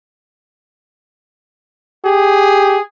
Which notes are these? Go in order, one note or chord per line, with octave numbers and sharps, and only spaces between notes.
G4 G#4